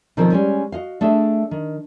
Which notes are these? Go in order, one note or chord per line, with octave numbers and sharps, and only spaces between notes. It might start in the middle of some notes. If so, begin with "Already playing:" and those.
B2 D#3 F3 C4 G#4 A#4
G3 G#3 C#4
F#4 D#5 F5
A3 D4 G#4 D#5 E5
D#3